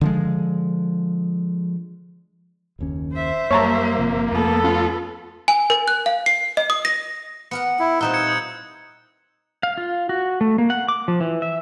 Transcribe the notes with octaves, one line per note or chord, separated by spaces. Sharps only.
D3 F3 G#3
F#1 D#2 C#4
C5 E5
F#2 G3 A#3 C#5 A5 A#5
G1 C3 F3
F2 F3 A3 B3 A4
C#4 F4
G#5
A#4
F#6
F5
C7
D#5
D#6
A#6
B3 A#4 F#5 C#7
E4
A#2 G3 C4 D#4 E6 F#6 E7
G#6 C#7
D#6 G6 G#6
F5
F4
F#4
A3
A#3
F#5
D6
F3
E3
E5